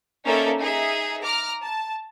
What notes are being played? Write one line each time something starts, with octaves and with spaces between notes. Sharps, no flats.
A#3 C#4 D#4 A4 D5 E5
D#4 G#4 E5
A#5 D6 F6
A5